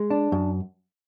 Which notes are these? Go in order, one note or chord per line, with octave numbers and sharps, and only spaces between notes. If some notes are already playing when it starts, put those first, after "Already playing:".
Already playing: G#3
D4
F#2